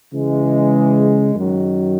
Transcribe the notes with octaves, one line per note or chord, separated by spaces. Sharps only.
C#3 E3 G#3
F#2 D#3 F#3